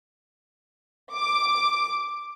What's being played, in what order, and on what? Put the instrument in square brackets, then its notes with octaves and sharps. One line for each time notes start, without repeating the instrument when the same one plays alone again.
[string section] D6